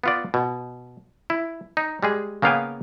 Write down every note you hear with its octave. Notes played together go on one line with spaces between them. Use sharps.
B3 F4 D5
B2
E4
D#4
G3 G#3 G#4
C#3 A#3 B3 F5 G5 G#5